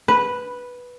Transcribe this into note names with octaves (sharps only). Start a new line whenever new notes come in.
B4